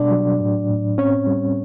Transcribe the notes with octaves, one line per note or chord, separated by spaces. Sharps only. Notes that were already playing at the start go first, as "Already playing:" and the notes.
Already playing: B2 G3 D4 D5
F#3
A2
A2
C4 C#4 C#5
G3